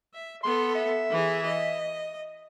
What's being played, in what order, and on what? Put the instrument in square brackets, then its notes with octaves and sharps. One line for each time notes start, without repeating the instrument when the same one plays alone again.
[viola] E5
[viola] B3 A4 [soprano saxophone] C6
[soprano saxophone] E5
[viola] E3 G#4
D#5